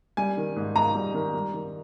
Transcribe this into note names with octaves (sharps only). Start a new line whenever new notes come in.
G3 G#5
D#3
G#2
G#2 A#5
G3
D#3
G3
D#3